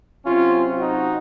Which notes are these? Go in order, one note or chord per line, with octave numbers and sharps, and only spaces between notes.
C3 F#3 C4 C#4 F4
D#4 F#4